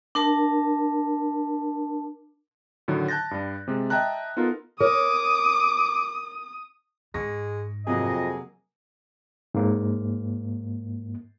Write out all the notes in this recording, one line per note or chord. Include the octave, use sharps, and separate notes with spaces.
D4 A#4 A5
A2 D3 D#3 F#3
A5 F#6 G6 A6 A#6
G2 G3
C3 G#3
D#5 E5 G5 A5 A#5 F#6
B3 D#4 F4 A4 A#4
A#4 C#5 D6 D#6
G#2 G#3 C#6 A#6
F2 C3 F#3 A#3 G#4 D#5
G#2 A#3